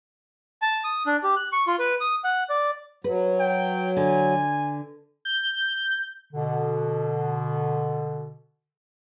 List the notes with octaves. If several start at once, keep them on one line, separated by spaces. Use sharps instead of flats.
A5
D#6
D4
G4
F#6
C#6
F4
B4
D#6
F#5
D5
F#3 B4
G5
D3 G#5
G6
B2 D3